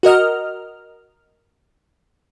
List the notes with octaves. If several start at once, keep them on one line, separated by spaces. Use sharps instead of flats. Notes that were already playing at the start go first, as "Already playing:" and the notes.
F#4 A#4 D#5 F6